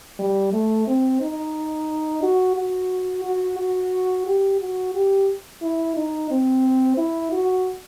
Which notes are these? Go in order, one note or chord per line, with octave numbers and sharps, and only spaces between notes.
G3
A3
C4
D#4
F#4
F#4
F#4
F#4
G4
F#4
G4
E4
D#4
C4
E4
F#4